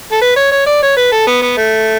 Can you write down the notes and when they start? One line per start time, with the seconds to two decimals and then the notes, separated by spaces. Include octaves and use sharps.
0.12 A4
0.21 B4
0.36 C#5
0.51 C#5
0.66 D5
0.82 C#5
0.97 B4
1.12 A4
1.27 B3
1.42 B3
1.57 A3